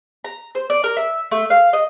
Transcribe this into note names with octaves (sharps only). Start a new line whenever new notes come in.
A#5
C5
D5
A#4
E5
A3
F5
D#5